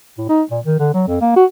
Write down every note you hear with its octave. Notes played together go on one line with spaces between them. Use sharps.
A2
D#4
A#2
D#3
D3
F#3
F2
A#3
F#4